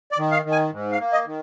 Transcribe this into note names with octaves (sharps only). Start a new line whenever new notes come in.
D5
D#3
F5
D#3
G#5
G#2
F5
A#3
D#5
D#3